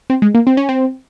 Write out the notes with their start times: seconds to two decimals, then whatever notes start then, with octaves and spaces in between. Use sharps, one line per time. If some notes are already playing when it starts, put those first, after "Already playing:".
0.10 C4
0.22 G#3
0.35 A#3
0.47 C4
0.57 C#4
0.69 C4